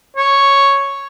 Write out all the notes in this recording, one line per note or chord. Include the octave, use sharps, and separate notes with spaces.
C#5